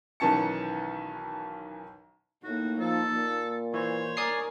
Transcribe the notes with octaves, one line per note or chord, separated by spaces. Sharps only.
B1 D#3 E3 C#4 A5 C#7
A2 A#3 D#4 F#4
F3 A4
A#2
E3 C5 C#5
A#4 D5 G#5 D#6 C7